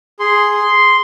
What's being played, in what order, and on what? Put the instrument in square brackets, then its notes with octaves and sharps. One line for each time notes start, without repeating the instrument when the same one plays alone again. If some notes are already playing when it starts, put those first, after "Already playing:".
[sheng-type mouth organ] G#4 C6